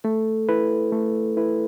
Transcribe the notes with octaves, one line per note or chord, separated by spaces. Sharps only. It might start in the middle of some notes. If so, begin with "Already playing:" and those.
A3 A4
E4 B4
A3
E4 B4